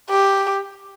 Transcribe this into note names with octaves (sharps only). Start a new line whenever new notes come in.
G4